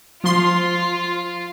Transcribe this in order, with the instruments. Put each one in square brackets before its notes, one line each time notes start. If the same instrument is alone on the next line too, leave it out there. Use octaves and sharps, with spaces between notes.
[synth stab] F3 C6 [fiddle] F4